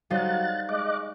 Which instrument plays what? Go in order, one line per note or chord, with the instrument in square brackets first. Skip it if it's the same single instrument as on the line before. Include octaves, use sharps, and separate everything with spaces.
[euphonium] F#3 [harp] G3 D#4 C5 [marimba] F5 [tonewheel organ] F#6 A6
[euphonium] G#3 [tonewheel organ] D#5 D6 F#6